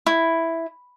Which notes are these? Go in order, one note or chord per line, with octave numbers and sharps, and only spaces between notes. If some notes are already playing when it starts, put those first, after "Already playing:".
E4